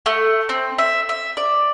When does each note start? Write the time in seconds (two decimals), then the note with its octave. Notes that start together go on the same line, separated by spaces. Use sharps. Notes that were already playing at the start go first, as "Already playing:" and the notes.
0.06 A3
0.49 C4
0.78 E5
1.09 E5
1.37 D5